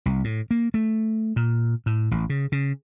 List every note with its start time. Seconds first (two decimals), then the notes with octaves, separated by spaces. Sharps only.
0.06 C2
0.24 A2
0.51 A#3
0.74 A3
1.36 A#2
1.86 A2
2.11 A1
2.30 C#3
2.52 C#3